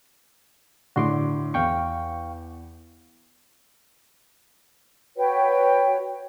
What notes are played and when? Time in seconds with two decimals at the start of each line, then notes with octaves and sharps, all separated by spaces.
0.96 A2 D3 F#4 C6 D6
1.54 E2 F5 G5 C#6
5.17 F#4 B4 C#5 G5